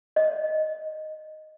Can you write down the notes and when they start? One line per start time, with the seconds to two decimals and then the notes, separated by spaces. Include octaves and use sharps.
0.16 D#5